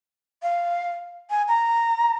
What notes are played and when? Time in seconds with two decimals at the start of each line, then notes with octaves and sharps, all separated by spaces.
0.43 F5
1.30 G#5
1.48 A#5